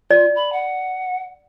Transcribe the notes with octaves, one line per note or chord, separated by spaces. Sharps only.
F4 D5
B5
F#5